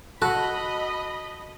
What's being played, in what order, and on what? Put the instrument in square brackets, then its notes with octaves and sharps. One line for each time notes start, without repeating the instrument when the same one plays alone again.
[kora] F#4 [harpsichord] A4 [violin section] D#5 B5